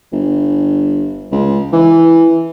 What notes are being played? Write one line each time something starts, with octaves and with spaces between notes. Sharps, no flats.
G1
C#2
E3